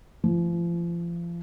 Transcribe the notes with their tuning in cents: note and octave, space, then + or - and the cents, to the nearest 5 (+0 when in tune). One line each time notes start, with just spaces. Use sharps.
F3 -35